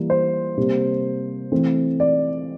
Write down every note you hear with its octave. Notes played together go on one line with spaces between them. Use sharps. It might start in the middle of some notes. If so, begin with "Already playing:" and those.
Already playing: E3 G3 A#3
C5
C3 G3 A#3
E3 A3 C4
D5